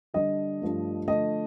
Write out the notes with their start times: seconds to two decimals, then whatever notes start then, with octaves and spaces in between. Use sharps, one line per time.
0.14 D3 G3 D4 D#5
0.62 G2 F3 A3
1.08 D3 F3 A3 D#5